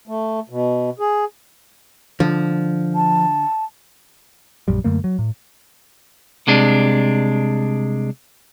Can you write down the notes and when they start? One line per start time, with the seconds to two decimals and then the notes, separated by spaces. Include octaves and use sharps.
0.08 A3
0.50 B2
1.00 G#4
2.20 D3 F3
2.95 A5
4.68 A#1 F#2 G3
4.84 F#2 D3 A3 A#3
5.04 F#3
5.19 A2
6.47 C2 C3 G#3 D4